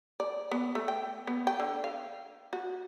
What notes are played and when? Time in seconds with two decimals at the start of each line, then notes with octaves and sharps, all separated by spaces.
0.20 D5
0.51 B3
0.75 A3
0.88 G5
1.27 B3
1.47 G5
1.60 D3
1.84 F5
2.53 F#4